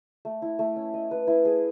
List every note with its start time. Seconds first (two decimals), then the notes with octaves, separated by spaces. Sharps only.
0.25 A3
0.42 E4
0.59 A3
0.76 C#4
0.94 D#5
1.11 B4
1.27 E4
1.45 G#4